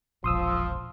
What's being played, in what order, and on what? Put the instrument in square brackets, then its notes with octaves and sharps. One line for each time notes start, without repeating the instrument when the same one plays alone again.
[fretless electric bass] E1 A#1 [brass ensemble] F3 [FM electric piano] C6 D#6 E6